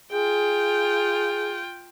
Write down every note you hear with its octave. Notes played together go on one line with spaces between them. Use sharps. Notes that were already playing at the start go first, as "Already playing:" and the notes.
F4 G#4 G5